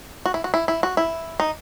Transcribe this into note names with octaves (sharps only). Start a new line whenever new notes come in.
F#4
E4
F#4
E4
E4
F#4
E4
D#4